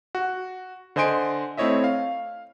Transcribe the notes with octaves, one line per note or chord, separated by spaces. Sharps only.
F#4
D3 C5 D#5 G#5 C6 D7
A3 C4 E4 C#5 D#5 E5
F5